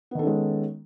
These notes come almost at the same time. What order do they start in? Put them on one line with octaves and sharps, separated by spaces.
B3 D#3 A4 C#4 G#3